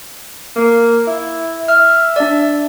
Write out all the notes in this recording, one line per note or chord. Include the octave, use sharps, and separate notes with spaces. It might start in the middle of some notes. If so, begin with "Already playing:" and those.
A#3
E4
E5 F6
D4 D5